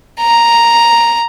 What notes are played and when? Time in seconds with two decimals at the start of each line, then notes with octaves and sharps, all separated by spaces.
0.21 A#5